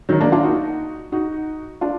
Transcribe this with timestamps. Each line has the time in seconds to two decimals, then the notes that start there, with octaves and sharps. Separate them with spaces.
0.09 D#3 F#3
0.21 A#3 D4
0.32 D4 F4
0.43 D#4 F#4
1.12 D#4 F#4
1.81 D4 F4